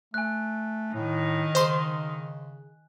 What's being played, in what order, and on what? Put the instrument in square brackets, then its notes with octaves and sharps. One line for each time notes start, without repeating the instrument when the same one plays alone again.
[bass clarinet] A3 [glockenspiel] G#5 F#6
[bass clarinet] A2 [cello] D#3 D#4
[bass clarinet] C#3 [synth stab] C5 C6